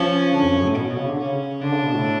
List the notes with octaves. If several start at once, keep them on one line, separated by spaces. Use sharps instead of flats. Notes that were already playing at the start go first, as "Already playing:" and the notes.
Already playing: F3 C#4
D3
F2
F#2
A2
B2 C#4
B2
C#3
D3
C#3 C#4
D3 D4
C#3
B2
A2